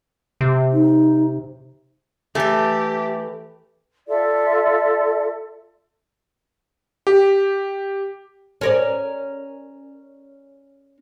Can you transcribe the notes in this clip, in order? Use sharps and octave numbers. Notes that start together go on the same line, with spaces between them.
C3
D#4
E3 A3 G4 A4
F4 A4 D5 E5
G4
C#4 A#4 D5